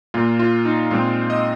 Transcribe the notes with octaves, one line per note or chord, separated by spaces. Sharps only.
A#2 A#3 F4
F4
D#4
A#2 G#3 C4 F4
D#5